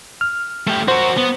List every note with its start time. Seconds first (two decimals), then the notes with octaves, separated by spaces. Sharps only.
0.21 F6
0.67 A3 G4
0.88 F#4 A#4 C5
1.17 B3